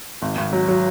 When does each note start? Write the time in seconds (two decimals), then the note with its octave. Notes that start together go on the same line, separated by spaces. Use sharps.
0.22 G#1
0.37 G#1
0.53 F#3
0.68 F#3